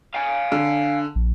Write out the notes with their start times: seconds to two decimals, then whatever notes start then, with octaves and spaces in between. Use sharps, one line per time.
0.14 F5 G#5
0.52 D3
1.15 A#1